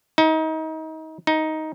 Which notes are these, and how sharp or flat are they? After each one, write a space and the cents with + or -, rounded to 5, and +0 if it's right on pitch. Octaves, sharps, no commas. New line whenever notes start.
D#4 +30
D#4 +10